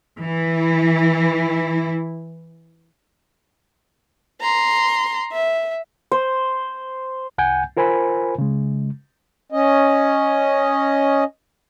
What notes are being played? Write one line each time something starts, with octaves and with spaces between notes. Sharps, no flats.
E3 E4
A#5 C6
E5
C5
C2 F#5 G#5 G6
F4 A#4 C5 G#5 B5
C#3 G#3
C#4 D#5